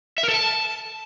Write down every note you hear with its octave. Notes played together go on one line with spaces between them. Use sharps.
E5
A#4
A4
A5